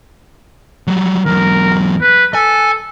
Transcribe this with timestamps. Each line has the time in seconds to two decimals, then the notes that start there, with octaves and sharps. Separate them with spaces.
0.87 F#3 G3
1.26 E2 F#3 A#4
2.02 B4
2.34 A4 G#5